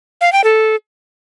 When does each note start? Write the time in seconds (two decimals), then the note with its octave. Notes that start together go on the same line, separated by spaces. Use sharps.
0.21 F5
0.32 G5
0.44 A4